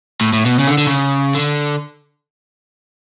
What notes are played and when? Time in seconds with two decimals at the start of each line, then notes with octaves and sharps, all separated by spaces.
0.21 A2
0.33 A2
0.46 B2
0.59 C#3
0.68 D3
0.78 D3
0.87 C#3
1.35 D3